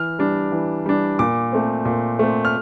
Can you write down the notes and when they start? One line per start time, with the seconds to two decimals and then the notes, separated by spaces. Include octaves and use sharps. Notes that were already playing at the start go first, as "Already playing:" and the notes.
Already playing: E3 F6
0.19 G3 D4
0.52 E3
0.86 G3 D4
1.19 A#2 D6
1.52 A3 C4
1.85 A#2
2.19 A3 C4
2.45 F6